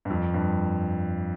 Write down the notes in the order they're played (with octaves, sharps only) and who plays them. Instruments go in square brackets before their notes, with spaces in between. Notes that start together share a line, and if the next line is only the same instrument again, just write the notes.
[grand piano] G2
F2
G2